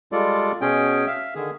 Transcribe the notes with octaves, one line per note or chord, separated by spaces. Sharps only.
G3 G#3 F4 A4 D5
B2 C#4 G#4 G5
E5 F5
D3 D#3 G#4